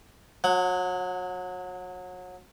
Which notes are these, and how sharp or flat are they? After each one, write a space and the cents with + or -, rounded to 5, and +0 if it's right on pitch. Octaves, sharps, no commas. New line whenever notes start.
F#3 -30 F#5 +0